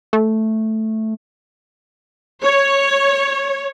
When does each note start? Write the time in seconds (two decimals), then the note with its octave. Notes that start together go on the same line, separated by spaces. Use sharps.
0.13 A3
2.43 C#5